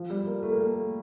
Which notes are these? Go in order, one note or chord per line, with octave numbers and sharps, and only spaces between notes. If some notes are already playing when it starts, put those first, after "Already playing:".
Already playing: F3
G3
A#3
A3
A#3
A3